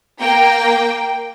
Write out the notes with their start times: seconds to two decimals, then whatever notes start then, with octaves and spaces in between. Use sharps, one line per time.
0.21 A#3 G5